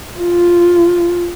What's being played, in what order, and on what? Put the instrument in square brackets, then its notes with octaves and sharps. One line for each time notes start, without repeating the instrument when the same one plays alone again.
[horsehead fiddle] F4